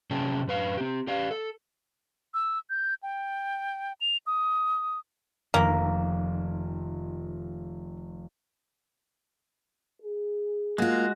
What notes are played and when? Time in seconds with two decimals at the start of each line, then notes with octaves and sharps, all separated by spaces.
0.10 C3 F#3 C#4 G#4 G5 A5
0.47 F#2 B4 F5
0.77 C4 G4
1.07 G4 D5 F5
1.31 A4
2.34 E6
2.70 G6
3.03 G5
4.01 F7
4.27 D#6
5.54 F1 F2 D#3 A#3
10.02 G#4
10.78 G#3 A#3 F4 F#4